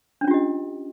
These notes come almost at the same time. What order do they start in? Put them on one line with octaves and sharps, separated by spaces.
D4 C#4 F4 G4 D#5